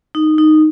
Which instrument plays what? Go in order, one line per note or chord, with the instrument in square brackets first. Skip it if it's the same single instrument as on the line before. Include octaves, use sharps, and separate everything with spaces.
[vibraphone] D#4
D#4